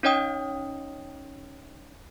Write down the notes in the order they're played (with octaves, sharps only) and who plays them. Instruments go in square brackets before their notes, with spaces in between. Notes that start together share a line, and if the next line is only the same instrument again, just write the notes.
[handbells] C#4 D#4 C#5 D#5 G5 D#6